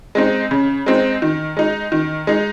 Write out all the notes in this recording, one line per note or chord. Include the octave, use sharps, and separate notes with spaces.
G#3 C4 D#4
C#3
G#3 C4 D#4
D#3
G#3 D#4
D#3
G#3 D#4